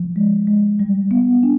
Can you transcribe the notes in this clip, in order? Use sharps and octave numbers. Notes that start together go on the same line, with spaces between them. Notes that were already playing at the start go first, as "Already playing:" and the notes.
Already playing: F3
G#3
G#3
G3
B3
D4